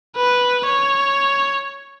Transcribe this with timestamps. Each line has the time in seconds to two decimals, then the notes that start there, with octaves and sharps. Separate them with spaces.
0.17 B4
0.66 C#5